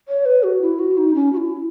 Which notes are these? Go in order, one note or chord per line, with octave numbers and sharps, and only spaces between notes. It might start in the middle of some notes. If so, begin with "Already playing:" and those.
C#5
B4
F#4
E4
F#4
D#4
C#4
F#4
E4